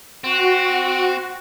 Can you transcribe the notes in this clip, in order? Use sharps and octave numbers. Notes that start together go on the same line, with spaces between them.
C4 F#4